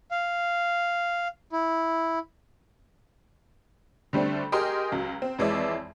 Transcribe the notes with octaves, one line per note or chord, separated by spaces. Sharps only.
F5
E4
D3 G3 A3 C4 D4
G4 G#4 A#4 D#5 C6 F6
C#2 F#3
C4
F2 E3 G#3 C#5 D5 E5